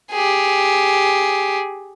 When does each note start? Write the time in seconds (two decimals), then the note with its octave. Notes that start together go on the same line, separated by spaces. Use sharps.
0.12 G4 G#4